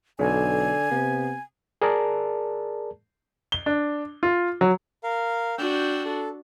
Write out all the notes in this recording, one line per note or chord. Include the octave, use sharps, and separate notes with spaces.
B1 D3 G#5
C3 B3
G#4 A#4 D5 A5
G7
D4
F4
F#3
A#4 F5
D4 F#4 G5 E6 G6
A4